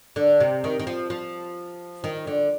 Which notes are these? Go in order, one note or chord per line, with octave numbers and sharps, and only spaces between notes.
D3
C3
D#3
D#3
F3
F3
D#3
D3